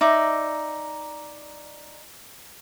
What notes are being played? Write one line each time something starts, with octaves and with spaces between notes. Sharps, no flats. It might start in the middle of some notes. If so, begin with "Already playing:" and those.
D#4 D5 E5 A#5